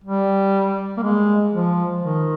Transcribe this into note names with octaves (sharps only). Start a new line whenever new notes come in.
G3
A#3
G#3
F3
D#3